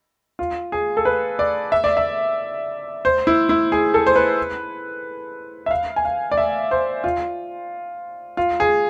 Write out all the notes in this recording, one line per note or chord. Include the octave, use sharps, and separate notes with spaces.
F4
G#4
A4
B4
D5
E5
D5
E5
C5
E4
E4
G#4
A4
C5
B4
E5
F5
G#5
F5
D5
E5
C5
F4
F4
G#4